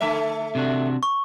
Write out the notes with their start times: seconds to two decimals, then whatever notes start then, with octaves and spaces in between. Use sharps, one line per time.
0.01 D3 A3 E5
0.55 C3 D4 F#4
1.03 C#6